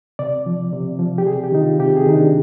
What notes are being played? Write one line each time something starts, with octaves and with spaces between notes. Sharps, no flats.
C3 D5
F3
C3
F3
G4
C3 G#4
G4
D#3 D#4
F4
C3 G4
G#4
D#3 D#4
D4